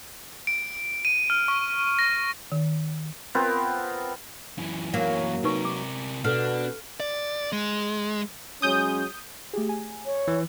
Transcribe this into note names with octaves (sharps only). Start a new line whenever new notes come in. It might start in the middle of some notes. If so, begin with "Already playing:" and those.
D7
D#7
F6
C#6
A#6
D#3
B3 C4 F4 A#4
F#2 E3
F#3 A#3
C3 D#4 A#4 B4 C#6
D6
B2 D4 A4 F6
D5
G#3
F#3 G#3 C#4 D#6 G6
A3 G4 G#4
G#5
C#5
E3